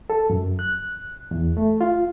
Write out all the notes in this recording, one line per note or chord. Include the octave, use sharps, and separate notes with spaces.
A4
F#2
F#6
E2
A3
F4